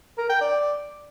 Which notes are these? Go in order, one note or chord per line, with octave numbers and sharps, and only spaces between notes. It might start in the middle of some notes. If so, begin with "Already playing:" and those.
A#4
G5
D5